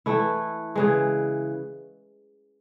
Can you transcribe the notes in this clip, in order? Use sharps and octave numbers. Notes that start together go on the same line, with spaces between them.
E3 A3 E4
C#3 E3 G#3